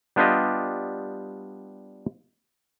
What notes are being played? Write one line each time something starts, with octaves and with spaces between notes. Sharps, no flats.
G3 B3 D4 F4 G4 D#5